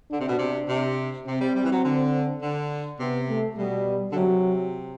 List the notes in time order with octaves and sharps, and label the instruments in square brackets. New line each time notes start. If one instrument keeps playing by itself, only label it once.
[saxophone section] D3 [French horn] D4
[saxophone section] C3
B2
C3
C3
[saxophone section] C3 [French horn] C4
[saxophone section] G3
G3
E3
F#3
D3
D3
[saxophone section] C3 [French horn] B3
[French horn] A3
[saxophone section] B2 [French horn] G3
[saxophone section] D3
[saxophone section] C3 [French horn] F#3